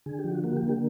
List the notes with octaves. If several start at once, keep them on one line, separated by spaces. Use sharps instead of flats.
D3 G#4
G4
F3
F#4
A#3 F#4
G4
D3
G4